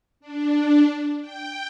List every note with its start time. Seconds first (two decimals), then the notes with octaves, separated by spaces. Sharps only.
0.20 D4
1.21 G5